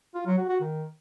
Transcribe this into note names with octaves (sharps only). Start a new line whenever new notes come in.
F4
F#3
F#4
F#4
D#3